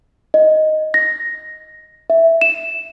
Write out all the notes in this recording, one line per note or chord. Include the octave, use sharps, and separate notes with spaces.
D#5
A#6
E5
E7